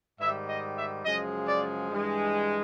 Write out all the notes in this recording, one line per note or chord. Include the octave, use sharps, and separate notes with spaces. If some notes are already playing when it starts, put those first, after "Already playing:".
G#2 D#3 G3 E5
D#5
E5
F#2 C#3 F3 G#3 D#5
D5
G2 E3 G#3